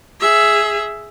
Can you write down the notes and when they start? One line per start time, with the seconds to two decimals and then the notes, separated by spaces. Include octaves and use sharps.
0.21 G#4 E5